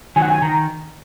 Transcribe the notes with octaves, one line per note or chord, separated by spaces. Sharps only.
D#3 F#3 G#5
F#5
G#5
D#3 A#5